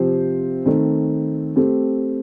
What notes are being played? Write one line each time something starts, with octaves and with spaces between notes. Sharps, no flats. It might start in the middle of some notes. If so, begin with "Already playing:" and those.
Already playing: C3 F3 C4 G4 C5
D#3 A3 C4
A3 C4 G4